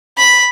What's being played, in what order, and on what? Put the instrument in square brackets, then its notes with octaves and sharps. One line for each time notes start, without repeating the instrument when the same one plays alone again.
[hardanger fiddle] B5